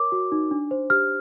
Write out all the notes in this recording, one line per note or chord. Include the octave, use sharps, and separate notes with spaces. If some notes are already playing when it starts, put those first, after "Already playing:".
Already playing: A#4 C#5 D6
F#4
D#4
D4
C5
G4 F6